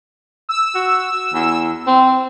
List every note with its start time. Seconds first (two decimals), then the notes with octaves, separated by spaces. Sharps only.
0.49 E6
0.75 F#4
1.33 E2
1.87 C4